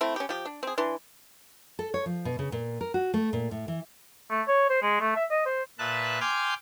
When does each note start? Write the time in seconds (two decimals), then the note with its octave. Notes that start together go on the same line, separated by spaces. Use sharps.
0.01 A3 C4 E4
0.16 C#4 G4
0.29 F3 G4
0.45 D4
0.63 C4 G#4
0.78 E3 D4 C6
1.79 A4
1.94 C#5
2.06 F3
2.25 B2
2.39 C#3
2.52 A#2
2.81 A#4
2.94 F#4
3.14 A3
3.33 A#2
3.51 A2
3.68 E3
4.30 A3
4.48 C#5
4.69 C5
4.82 G#3
5.01 A3
5.16 E5
5.30 D#5
5.45 C5
5.79 A#2 B4 E5 A5 F#6
6.21 G5 G#5 C6 D6 F6 G6